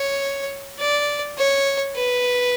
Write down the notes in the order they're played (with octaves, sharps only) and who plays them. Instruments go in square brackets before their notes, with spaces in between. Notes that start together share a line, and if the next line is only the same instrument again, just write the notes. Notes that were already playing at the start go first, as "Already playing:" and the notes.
Already playing: [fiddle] C#5
D5
C#5
B4